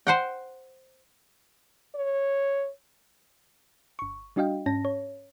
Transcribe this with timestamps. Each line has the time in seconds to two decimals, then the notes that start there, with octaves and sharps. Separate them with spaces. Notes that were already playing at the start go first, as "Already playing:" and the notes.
0.07 C5 F#5 G5
1.95 C#5
3.99 G1 C#6
4.36 G3 D4 F#4 D#5 F5 G5
4.66 G#2 C#4 A5 A#6
4.85 C#5